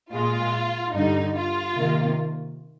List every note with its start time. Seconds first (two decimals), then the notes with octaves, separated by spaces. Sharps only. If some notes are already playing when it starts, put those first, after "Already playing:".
0.12 A#2 G#3 F4
0.93 G2 D3 G3 D#4
1.35 F4
1.75 C3 D#3 A#3